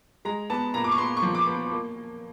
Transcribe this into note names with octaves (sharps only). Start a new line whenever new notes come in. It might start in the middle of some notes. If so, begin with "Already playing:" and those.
G#3 A#5
B3 A5
A#2 A#5
D6
C#6
B3 C6
C#6
F3
D6
B3
A#3